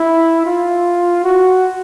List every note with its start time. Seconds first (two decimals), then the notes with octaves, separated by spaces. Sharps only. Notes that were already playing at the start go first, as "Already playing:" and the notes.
Already playing: E4
0.46 F4
1.24 F#4